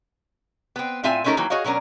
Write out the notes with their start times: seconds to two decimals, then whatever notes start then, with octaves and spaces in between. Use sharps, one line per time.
0.76 B3 C4
1.04 A2 C4 F4 E5 G#5
1.24 G#3 A3 C#4 D#4 A4 A#4
1.37 D#3 E3 F#3 A#3
1.50 F#4 G#4 C#5 D#5 F5
1.64 B2 F#3 C#4 D4 A#4